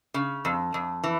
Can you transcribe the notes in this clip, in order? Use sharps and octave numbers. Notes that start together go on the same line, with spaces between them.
C#3
F2
F2
E3